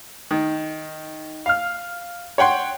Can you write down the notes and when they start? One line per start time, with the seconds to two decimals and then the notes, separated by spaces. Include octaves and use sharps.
0.31 D#3
1.46 F5 F6
2.38 C#5 F#5 G5 C6